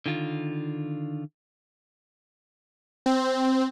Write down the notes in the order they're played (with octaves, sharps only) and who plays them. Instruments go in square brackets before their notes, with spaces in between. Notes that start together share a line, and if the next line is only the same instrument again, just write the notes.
[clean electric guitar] D3 D#3 F4
[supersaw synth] C4